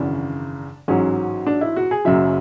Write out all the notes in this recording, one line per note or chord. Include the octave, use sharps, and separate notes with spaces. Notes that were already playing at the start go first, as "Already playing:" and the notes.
Already playing: G#1 F#2 C#3 E3 D4
A1 G#2 F#3 C#4
D4
E4
F#4
G#4
F#1 F#2 C#3 F#3 E5